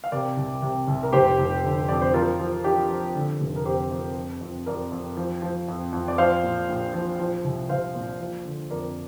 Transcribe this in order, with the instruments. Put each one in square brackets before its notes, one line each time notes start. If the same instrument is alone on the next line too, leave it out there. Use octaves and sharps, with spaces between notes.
[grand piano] F5
C3 A#4 D5
C2
C3
C2
A#4
F1 G4 C5
F1
D3
F2 D5
C5
F3 F4 A#4
F3
F3 D4 G4
F3
D3
F1
A#4
F2 G4 C5
F2
F2
F2
F2 A#4 D5
F2
F3
F3
F2
F2
D5
F3 C5 F5
A#2
A#1
F3
F3
C2
C2 C5 F5
A#2
F3
D3
F2 A#4 D5